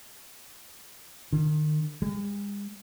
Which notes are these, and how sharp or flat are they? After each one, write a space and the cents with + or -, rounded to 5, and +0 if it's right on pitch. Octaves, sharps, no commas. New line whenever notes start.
D#3 -35
G#3 -45